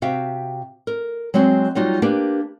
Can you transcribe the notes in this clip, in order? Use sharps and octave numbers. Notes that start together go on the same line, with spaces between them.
C3 F#4 E5 F5 G5
A#4
F#3 G#3 C4 F#4
F#3 G3 D#4 F4 F#4
A#3 D4 G4 A#4 B4